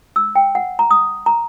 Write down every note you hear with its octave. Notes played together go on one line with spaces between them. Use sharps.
E6
G5
F#5
A#5
D#6
A#5